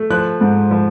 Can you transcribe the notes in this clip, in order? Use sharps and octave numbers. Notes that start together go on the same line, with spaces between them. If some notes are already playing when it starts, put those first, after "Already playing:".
Already playing: A3
F3 F#6
G#2
F3